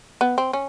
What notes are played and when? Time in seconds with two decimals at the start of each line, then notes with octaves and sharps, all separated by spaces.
0.21 B3
0.38 C4
0.53 C#4